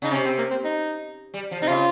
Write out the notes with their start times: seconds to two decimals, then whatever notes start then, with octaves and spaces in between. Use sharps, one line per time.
0.02 C#3 D#4
0.11 C3 C#4
0.25 C4
0.38 A#3
0.51 C4
0.64 D#4
1.34 G3
1.51 F3
1.62 C3 D#4
1.68 C#3 F4